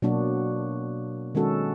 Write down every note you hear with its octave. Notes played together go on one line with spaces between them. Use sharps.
B2 F#3 A#3 D4 F#4
D#3 G#3 C#4 F#4 A4